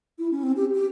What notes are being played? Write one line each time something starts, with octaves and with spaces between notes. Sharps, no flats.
E4
C#4
C4
G4
G4